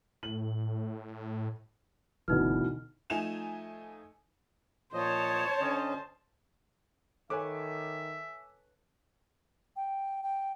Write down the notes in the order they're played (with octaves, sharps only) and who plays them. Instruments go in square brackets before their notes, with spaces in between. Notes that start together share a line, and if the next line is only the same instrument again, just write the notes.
[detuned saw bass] A2 [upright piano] F#7
[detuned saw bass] F#1 [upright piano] D2 B2 E3 [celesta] D#4 F6
[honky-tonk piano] F3 A3 D#4 G#5 E7 F7
[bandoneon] A#2 F3 D#5 [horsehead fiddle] C5 A5 [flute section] C#5
[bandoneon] D3 C#4 D#5
[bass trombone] D#3 [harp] A4 B4 C#5 [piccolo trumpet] E5 [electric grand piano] G#5 D6
[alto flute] G5
G5